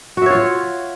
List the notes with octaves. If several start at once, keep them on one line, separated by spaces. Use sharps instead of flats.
F4 F#4 C#5 E5